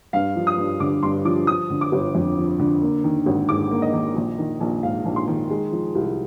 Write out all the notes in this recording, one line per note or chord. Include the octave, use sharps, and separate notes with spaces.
G2 F5
F3
D#6
G2
D3 D6
G2 C6
F3 D6
F3 D#6
D3
D6
G1
F2
F3
D3
A#3
D#3
G#1
G#2 D6
A#3
D#5
D#3
A#1
D#3
A#1
G#2 F5
A#1
C6
D#3
G#3
F3
C2